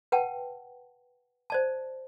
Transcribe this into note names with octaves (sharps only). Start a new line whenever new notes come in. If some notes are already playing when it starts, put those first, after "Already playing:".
B4 F#5 G5 A5
C5 D5 A5